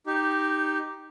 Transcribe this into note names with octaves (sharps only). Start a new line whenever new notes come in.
D#4 G4